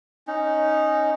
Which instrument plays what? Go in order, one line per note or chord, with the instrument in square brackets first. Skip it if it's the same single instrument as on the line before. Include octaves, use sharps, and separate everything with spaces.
[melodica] C#4 D#4